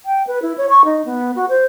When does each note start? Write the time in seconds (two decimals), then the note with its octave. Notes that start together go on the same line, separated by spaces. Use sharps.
0.05 G5
0.27 B4
0.42 E4
0.58 C#5
0.70 C#6
0.85 D#4
1.05 B3
1.36 F#4
1.49 C5